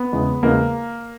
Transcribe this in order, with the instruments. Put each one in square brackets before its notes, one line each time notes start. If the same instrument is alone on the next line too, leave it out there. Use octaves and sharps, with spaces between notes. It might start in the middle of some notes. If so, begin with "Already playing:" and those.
Already playing: [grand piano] B3
E2 C#3 G#3
E2 C#3 G#3 A#3